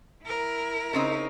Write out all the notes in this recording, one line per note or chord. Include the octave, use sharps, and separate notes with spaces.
E4 A#4
C#3 C4 D#4